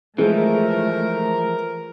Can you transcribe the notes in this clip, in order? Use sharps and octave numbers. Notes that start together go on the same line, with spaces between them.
E3 F3 G#3 A3 G#4 A#4